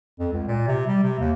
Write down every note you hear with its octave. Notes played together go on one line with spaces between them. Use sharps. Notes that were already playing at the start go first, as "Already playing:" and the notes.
F2
C#2
A#2
C3
G3
C3
D#2